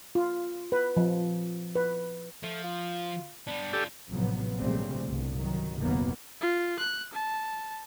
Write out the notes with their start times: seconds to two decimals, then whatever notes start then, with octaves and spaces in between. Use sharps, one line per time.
0.15 F4
0.72 B4
0.97 F3
1.76 B4
2.43 F3 A3
2.64 F4
3.47 G3 B3 D4
3.73 C#4 F4 G4 A4
4.11 A1 C3 F3 F#3 B3
4.57 A#1 G#2 C#3 G3 A3 C4
5.04 G1 C2
5.38 D#3 F#3
5.79 F#1 D#2 B2 D#3 A#3 B3
6.41 F4
6.79 F#6
7.13 A5